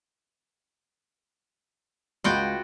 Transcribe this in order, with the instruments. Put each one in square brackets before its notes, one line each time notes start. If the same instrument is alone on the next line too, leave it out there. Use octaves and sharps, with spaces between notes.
[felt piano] C#2 B5 [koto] F4 F#4 G5